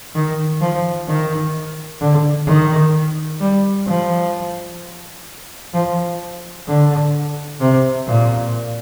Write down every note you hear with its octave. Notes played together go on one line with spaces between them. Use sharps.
D#3
F3
D#3
D3
D#3
G3
F3
F3
D3
C3
A#2